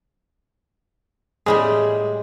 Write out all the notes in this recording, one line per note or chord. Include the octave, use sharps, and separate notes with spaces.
A2 G3 G#3 G#4